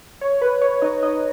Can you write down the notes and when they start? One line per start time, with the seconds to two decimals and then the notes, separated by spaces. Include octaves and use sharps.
0.21 C#5
0.42 B4
0.61 C#5
0.82 D#4 D#5
1.03 D#4 D#5